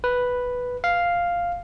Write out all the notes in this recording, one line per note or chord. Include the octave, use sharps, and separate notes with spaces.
B4
F5